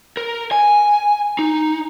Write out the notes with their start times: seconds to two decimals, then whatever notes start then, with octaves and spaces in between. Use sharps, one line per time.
0.17 A#4
0.51 G#5
1.39 D#4